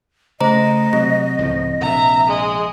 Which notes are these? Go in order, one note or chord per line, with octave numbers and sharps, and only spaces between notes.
C#3 A3 C5 D#5 A#5
C3 F#3 C4
C#2 A2 F3
A#1 C3 E5 A#5
G#3 D#5